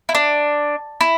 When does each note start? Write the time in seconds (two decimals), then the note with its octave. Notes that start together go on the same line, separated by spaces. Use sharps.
0.09 E4
0.15 D4
1.01 E4